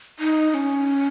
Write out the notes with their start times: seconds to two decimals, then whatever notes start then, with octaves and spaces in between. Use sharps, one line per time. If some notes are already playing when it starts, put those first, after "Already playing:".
0.19 D#4
0.50 D#4
0.54 C#4